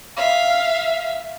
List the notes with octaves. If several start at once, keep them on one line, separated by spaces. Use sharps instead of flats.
E5 F5